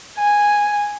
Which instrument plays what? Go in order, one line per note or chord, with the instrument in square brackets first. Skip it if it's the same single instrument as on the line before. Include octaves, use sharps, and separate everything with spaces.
[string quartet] G#5